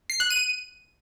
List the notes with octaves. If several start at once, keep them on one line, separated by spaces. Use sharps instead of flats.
C7
F#6
D#7